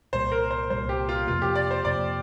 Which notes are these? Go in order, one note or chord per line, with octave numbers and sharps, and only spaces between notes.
C2 A#2 G3 C5
A#4
C5
C2 A#2 G3 C5
G4
F4
F2 C3 A#3 F4
G4
D5
C5
F2 C3 A#3 D5